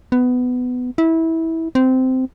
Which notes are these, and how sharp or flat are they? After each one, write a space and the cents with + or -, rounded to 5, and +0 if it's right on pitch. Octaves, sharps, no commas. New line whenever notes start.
B3 +15
E4 -20
C4 -15